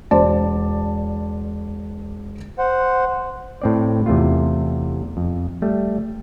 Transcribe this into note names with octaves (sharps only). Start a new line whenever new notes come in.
E1 C5 D5 A5
C5 F#5
A2 C4 D5
E2 C3 A3 F4
F2
G3 A3